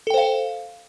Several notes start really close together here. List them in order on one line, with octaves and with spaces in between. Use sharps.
A4 G5 C5 F5